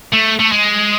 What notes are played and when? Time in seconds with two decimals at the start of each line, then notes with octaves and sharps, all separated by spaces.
0.12 A3
0.39 A3
0.52 G#3